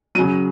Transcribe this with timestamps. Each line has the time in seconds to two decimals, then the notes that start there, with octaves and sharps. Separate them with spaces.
0.15 C#3 F#3 D#7